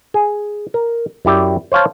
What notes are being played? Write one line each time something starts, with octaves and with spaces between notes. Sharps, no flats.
G#4
A#4
F#2 E4 G4 D5
C5 C#5 F5 A5